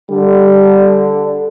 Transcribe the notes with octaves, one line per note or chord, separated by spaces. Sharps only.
D3 G3